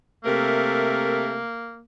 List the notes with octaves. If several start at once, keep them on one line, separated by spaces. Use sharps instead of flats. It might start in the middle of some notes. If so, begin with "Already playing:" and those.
C3 A3 A#3 A#4